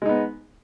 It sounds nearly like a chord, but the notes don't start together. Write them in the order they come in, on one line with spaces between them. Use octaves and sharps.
G#3 D#4 B3